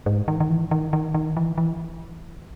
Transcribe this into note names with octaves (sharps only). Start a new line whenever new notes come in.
G#2
D#3
D#3
E3
D#3
D#3
D#3
E3
E3